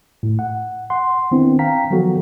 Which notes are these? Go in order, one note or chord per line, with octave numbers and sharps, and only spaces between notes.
A2
F#5
F#5 C6
D#3 B3 C4 D4 E4
F5 G5 A#5 B6
D#3 F3 F#3 B3 F#4 A4